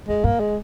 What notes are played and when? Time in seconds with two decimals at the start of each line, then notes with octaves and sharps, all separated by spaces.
0.08 F2 G#3
0.24 G2 A#3
0.40 G#3